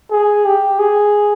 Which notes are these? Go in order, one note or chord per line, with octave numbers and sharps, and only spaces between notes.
G#4
G4
G#4